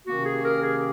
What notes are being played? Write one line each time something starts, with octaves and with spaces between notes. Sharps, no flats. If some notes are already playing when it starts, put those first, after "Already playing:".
C3 D#3 A#3 C#4 F#4
G#4
A#4
G#4